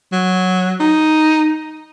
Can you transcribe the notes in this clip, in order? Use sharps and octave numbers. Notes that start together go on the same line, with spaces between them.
F#3
D#4